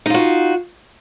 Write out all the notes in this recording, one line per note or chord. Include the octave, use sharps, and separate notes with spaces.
D#4 F4 F#4